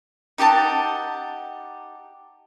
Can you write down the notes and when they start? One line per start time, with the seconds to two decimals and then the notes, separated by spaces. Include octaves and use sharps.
0.38 D#4 G4 F#5 A5